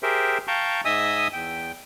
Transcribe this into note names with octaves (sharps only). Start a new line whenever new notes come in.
G4 G#4 A#4 C5 E5 G5
F5 G5 A5 A#5 C#6 G6
G#2 D#5 E5 G#5 D#6 E6
E2 G5